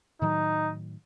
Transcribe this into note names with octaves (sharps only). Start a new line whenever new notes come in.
A2 D#3 F#3 D#4